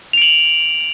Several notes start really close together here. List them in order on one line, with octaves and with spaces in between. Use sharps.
F7 D7 F#7